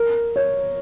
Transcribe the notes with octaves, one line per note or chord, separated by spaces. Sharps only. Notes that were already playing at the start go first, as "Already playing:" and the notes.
Already playing: A#4
C#5